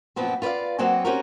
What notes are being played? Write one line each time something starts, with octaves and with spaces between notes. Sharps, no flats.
F#2 A#2 F3 B3 C4
F4 B4 C5 D5 F5
F#3 A#3 C4 D#5 F#5 G#5
C4 C#4 D#4 F#4 G4 A#4